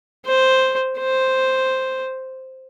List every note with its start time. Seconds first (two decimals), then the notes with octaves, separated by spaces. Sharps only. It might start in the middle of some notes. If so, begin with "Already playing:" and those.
0.26 C5
0.99 C5